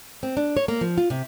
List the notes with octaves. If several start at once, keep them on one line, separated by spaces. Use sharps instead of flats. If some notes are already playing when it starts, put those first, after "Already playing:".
C4
D4
C#5
A#3
F3
F4
C3